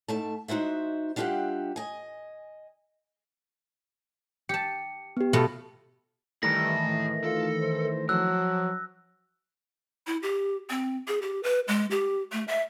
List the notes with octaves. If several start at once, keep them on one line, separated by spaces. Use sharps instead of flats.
G#2 A3 A5
G#3 D#4 F#4 C5 E5
G3 D4 F4 G4 E5 F#5
D#5 G#5
G4 A5 C#7
B3 G4
B2 A3 F4
D#3 E3 G3 A3 G#4 A#5 A#6
A2
F4 A4
C5
F3 F#3 E6 F#6
E4
G4
C4
G#4
G4
B4
G#3
G4
A3
E5